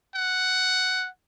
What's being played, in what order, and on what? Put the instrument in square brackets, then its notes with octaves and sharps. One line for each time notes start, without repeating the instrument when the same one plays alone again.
[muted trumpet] F#5